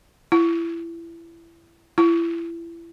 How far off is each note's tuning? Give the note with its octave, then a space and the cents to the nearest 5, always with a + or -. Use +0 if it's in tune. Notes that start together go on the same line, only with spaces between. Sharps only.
E4 +25
E4 +30